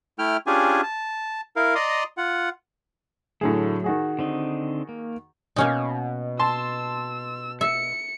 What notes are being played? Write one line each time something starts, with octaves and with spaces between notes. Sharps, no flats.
A3 E4 G5 F6
C#4 D4 F4 G4 G#4 G#5
A5
E4 A#4 F5
D5 D#5 A#5 C6 D#6
F4 F#5
A2 D3 F#3 A3 G#4
D#3 F#4 G#4
D3 C4 D#4
A#3
B2 A#3 C#4 D#4
A5 C6 E6
E5 C#7